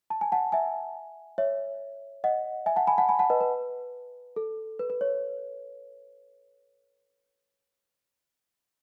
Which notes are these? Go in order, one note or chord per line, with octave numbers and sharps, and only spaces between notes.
A5
G#5
F#5 A5
E5 G#5
C#5 E5
D#5 F#5
E5 G#5
F#5 A5
G#5 B5
F#5 A5
G#5 B5
F#5 A5
B4 D#5
B4
A4
B4
B4
C#5